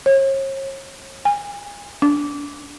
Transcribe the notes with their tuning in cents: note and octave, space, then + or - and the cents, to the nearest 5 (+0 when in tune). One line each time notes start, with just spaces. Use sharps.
C#5 -40
G#5 -25
D4 -20